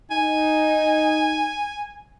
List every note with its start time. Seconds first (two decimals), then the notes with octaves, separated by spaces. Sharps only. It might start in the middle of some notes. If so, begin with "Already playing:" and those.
0.11 D#4 G#5